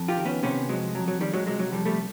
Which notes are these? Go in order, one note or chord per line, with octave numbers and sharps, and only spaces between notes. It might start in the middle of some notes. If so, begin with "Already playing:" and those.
Already playing: F2
F4 G4
D#3
B3 C#4
C3 B3 C#4
F2 F#3 G#3
F2 F#3
F#3
D#3 G3
F#3 G#3
C3 F#3 G#3
F#3
F2 G3
G3 A3